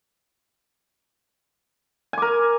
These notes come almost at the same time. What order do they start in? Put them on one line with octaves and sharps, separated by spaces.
G#5 D6 A#4